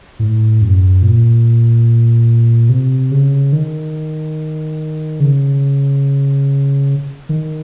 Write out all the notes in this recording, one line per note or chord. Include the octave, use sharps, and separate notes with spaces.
A2
F#2
A#2
C3
C#3
D#3
C#3
D#3